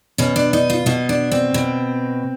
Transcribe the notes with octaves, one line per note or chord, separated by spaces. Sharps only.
B2 C#4
D4
D#4
F4
B2 D#4
D4
C4
B2